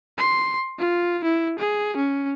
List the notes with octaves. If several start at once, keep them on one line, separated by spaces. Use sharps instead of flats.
C6
F4
E4
G#4
C#4